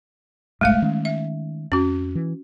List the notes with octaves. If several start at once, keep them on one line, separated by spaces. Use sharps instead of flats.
F#1 B1 G2 G#3 A3 F5
D#3 C#4
E5
F2 C#4 F#4
E3